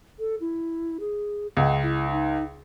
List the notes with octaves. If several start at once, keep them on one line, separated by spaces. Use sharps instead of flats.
A4
E4
G#4
C#2 F#5
E4
D#4